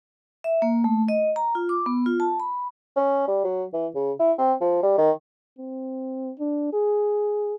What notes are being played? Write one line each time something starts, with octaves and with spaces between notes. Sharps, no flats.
E5
A#3
A3
D#5
A#5
F4
D6
B3
F4
A5
B5
C#4
G3
F#3
E3
C#3
E4
C4
F3
G3
D#3
C4
D4
G#4